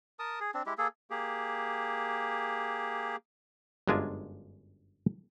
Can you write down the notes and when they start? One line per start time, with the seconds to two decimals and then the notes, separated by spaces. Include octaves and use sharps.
0.19 A#4 A5 D#6
0.41 G#4
0.54 C4 D4
0.66 G#3 E4 G4
0.78 A#3 G#4 A4
1.10 A#3 G4 G#4
3.87 G1 F#2 G#3 D4 F4 G#5